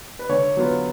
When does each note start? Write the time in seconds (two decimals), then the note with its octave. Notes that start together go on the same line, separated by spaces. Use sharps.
0.19 B4
0.29 D3 C#5
0.57 F#3 B3 F4